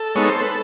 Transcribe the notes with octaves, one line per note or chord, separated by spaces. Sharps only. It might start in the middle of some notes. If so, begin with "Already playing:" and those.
Already playing: A4
G#3 B3 D#4 C#5
C5
B4